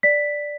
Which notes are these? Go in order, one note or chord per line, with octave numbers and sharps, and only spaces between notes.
D5 B6